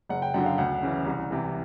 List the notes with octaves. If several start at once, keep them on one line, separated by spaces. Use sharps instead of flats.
F#1 F#5
G5
F#2 D3 F#3 F#5
F5
D2 F#5
C#3 E3
C2
C3 E3